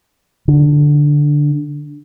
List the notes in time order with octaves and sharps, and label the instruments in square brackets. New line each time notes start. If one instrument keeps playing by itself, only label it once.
[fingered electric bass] D3